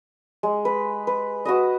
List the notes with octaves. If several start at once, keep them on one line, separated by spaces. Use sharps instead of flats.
G#3
B4
B4
F#4 B4 D#5